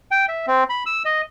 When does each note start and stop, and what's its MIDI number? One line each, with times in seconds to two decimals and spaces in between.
0.11 0.26 79
0.28 0.46 76
0.47 0.64 60
0.70 0.83 83
0.86 1.03 88
1.05 1.21 75